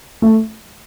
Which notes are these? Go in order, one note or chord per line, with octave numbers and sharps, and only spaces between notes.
A3